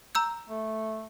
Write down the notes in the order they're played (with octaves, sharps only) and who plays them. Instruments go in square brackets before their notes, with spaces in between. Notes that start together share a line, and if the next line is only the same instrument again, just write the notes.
[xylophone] A#5 E6 G6
[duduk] A3